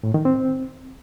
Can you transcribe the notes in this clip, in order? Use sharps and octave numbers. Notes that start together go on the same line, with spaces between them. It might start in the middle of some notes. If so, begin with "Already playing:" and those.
A2
D#3
C4